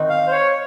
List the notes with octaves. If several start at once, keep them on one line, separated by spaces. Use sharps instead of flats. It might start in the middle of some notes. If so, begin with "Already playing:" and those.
Already playing: D#3 C4 D#4 F#4
F5
C5
C#5